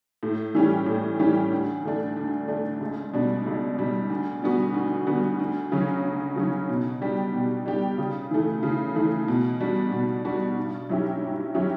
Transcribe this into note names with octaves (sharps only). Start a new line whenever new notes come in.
A2
E3 G3 C#4 G4
A2
E3 G3 C#4 G4
D2
D3 A3 D4
D2
D3 A3 D4
C#2
B2 G3 D4
C#2
B2 G3 D4
D2
D3 G3 B3 F#4
D2
D3 G3 B3 F#4
D2
C#3 F#3 C#4
D2
C#3 F#3 C#4
B2
G3 D4 G4
B2
G3 D4 G4
C#3
E3 A3
C#3
E3 A3
B2
G3 D4 F#4
B2
G3 D4 F#4
G2
F#3 C#4 E4 G4
G2
F#3 C#4 E4 G4